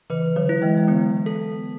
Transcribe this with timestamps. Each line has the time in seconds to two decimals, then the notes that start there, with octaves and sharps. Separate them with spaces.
0.10 C#3 E3 B4
0.36 D3 F#3
0.49 E4
0.62 E3 G#3
0.77 G#3
0.87 D3 F#3 B3
1.26 A4